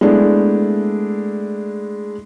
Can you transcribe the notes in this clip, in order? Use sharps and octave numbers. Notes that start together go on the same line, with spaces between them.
G#3 A3 B3 D4 E4